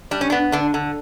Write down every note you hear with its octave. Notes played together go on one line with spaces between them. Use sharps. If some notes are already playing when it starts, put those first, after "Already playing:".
G3 D4
C#4
B3 D4
D3 D4
D3